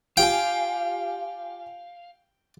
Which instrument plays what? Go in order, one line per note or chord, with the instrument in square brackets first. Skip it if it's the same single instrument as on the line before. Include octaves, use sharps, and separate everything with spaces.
[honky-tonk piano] F4 G4 G#5 [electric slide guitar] F5 [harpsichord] G5